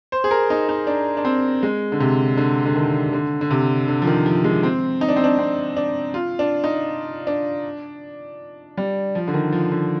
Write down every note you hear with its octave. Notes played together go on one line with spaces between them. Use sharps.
C5
G#4
A#4
D#4
D#4
D4
D4
C4
G#3
D3
C3
D3
D3
D#3
D3
D3
C3
D3
F3
D#3
F3
G#3
C4
D#4
D4
C4
D4
C4
D4
F4
D4
D#4
D4
G3
F3
D3
D#3
F3
D3